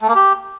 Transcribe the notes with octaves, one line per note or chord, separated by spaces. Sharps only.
A3
A#3
G4